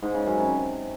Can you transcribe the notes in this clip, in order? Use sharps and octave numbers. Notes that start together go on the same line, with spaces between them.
G#2
C#3
F#2
C3